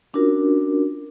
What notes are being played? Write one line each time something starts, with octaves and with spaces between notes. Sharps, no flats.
C#4 D4 F4 F#4 A#4